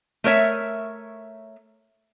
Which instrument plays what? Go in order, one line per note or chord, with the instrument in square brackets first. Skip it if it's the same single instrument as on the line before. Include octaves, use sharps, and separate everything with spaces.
[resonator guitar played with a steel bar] A3 A#4 C#5 E5